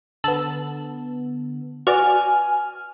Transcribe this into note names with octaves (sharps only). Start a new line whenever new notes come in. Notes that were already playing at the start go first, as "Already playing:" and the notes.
D3 B3 A5 E6 F#7
F#4 B4 D5 G#5 F6